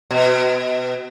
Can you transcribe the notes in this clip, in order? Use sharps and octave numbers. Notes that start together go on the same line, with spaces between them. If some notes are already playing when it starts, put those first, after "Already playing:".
B2